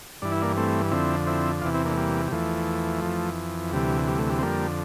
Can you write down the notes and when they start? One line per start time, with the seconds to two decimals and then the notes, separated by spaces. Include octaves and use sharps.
0.22 G2 E3 D4
0.32 E4
0.42 A#3 D4
0.57 A3 C4
0.92 F2 D3 C4 E4
1.27 C4 E4
1.62 E2 C3 E3 D4 F4
1.74 C4 E4
1.85 A#3 D4
1.91 A3
1.97 G3 A#3
2.27 G3
2.32 E2 E3 F3 A3
3.02 F2 E3
3.72 D2 C3 E3 G3
4.08 G3
4.19 A3
4.30 G3
4.39 C4
4.42 F2 D3 G3 A#3